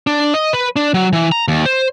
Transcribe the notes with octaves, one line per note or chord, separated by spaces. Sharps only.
D4
D#5
B4
D4
F#3
E3
A#5
D#2
C5